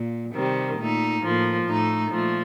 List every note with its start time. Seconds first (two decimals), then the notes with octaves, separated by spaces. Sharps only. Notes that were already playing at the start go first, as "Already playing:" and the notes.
Already playing: A#2
0.33 C3 D#3 G3 C4
0.78 A#2 A3 D#4
1.22 A2 F3 A#3
1.66 A2 A3 D#4
2.09 A#2 F3 A3